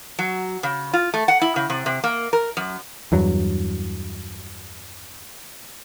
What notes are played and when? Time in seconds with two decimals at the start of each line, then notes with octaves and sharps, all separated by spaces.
0.19 F#3
0.63 C#3
0.93 F4
1.14 A3
1.28 F#5
1.42 E4
1.56 C#3
1.70 C3
1.86 C3
2.04 A#3
2.33 A#4
2.57 F#2
3.12 E2 G2 F#3